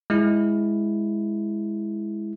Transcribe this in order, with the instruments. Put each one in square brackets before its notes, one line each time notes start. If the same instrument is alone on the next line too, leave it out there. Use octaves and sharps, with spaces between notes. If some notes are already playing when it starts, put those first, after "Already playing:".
[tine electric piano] G#3 E4